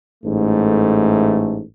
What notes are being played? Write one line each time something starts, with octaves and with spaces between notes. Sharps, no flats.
A1 G#2 A3